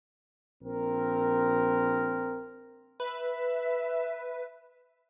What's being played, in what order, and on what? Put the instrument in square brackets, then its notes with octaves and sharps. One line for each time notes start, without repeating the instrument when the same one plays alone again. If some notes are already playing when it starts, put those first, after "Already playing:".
[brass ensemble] A#1 C4 A#4
[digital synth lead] B4 [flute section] E5